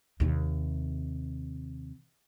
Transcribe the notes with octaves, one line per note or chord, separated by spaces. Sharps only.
D#2 C3